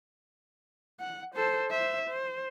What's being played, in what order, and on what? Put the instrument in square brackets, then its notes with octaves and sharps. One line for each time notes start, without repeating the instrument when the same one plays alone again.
[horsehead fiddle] F#5
A4 C5
C5 E5
C5